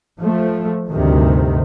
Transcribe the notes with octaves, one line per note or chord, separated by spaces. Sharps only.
F3 A3
D2 G2 C3 D#3